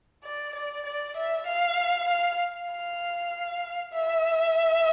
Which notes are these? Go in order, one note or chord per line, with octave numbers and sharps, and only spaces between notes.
D5
D5
D5
E5
F5
F5
F5
E5